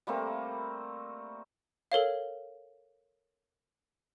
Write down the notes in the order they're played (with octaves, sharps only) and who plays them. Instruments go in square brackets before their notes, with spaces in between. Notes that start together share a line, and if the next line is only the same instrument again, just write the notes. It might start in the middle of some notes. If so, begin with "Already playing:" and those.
[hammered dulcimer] G3 A3 A#3 C4
[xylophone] A4 A#4 C#5 F5